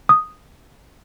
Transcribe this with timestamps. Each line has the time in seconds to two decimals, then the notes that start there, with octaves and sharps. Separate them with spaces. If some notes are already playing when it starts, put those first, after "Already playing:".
0.09 D#6